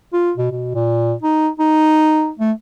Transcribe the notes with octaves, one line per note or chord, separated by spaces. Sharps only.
F4
B2
B2
A#2
D#4
D#4
A3